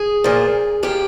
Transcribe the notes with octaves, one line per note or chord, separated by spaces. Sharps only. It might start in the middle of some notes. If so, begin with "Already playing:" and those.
Already playing: G#4
A#2 F3
A#2 F3 G4